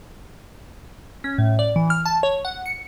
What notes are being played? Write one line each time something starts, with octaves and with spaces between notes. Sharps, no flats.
C#4
A2
D5
E3
F6
A5
C#5
F#5
C#7